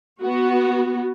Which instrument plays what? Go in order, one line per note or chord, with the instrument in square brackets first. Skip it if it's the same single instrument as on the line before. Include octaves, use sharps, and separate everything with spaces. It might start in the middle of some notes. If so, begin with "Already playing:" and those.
[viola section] B3 F#4